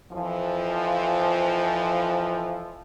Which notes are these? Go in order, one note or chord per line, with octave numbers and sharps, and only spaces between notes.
F2 E3 F3